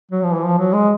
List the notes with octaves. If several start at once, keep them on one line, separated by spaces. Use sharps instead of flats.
F#3
F3
E3
F3
F#3
G#3